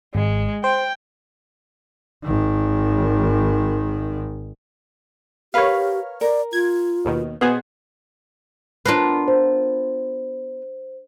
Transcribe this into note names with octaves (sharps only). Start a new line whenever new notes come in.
G#1 G#3
C5 G5
G#1 D#3
G4 A#4 B4 C#5 F5 F6
A#4 D5
F4 G#6
D#2 B2 D#3
B2 B3 F#4 G#4 C5
B3 D4 F4 A#4 F5
C5